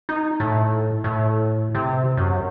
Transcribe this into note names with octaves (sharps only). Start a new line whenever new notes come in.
D#4
A2
A2
C3
F#2